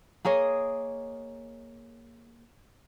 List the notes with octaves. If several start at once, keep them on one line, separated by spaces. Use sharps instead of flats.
A#3 G#4 C#5 D#5